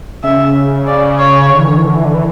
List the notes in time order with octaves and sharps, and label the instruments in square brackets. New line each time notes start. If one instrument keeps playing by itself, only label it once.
[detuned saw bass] C#3 [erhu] E5
[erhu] D5
C#5
[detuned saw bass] D3
E3
D3
E3
D3
E3
D3
E3